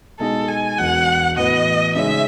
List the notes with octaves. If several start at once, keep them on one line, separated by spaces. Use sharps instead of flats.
B2 G#3 D#4 G#4 A4 D#5
G#5
E1 E2 B2 F#3 F#5
A2 E3 B3 F#4 B4 D#5
C#3 G#3 D#4 G#4 C#5 E5